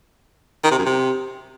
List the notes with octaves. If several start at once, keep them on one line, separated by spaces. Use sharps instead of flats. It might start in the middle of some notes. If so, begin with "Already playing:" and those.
D#3
C3
F#2
C3